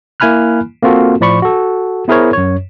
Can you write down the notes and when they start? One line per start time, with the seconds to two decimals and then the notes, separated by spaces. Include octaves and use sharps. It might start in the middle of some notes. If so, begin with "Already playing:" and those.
0.20 A#3 E4 G#5 B5 F6 F#6
0.83 A#3 C4 F4 F#4 A4
1.21 A2 F3 D5 B5 C#6
1.42 F#4 A4
2.08 B3 E4 G#4 A#4 C5 C#5
2.33 F#2 C#5